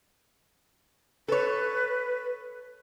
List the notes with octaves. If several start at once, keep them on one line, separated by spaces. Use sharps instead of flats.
A4 B4 C#5